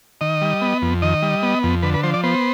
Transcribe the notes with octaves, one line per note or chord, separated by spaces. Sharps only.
D#3 D#5
G3
B3
F2
D#3 D#5
G3
B3
F2
D3 B4
B4
F3 C5
D5
B3 C5